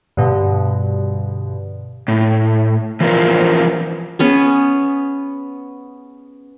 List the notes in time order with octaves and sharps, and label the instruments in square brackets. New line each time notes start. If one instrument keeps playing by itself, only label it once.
[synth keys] G2 B2 D3
[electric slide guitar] A2
E3 F3 B3 F4 A#4 C5
[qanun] B3 C#4 G#4